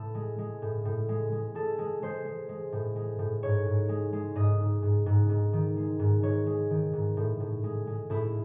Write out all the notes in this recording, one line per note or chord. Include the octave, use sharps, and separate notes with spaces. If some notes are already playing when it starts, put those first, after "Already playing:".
Already playing: A2 A4
G#3
G#3
A2
A2
G#3
G#3
G#3 A4
G#3
G#3 C5
G#3
G#3
A2
G#3
A2
G#2 C#5
G#2
G#3
G#3
G#2 D#5
G#2
G#2
G#2
G#2
D#3
G#3
G#2
G#2 C#5
G#3
D#3
G#2
A2
A2
G#3
G#3
A2 E4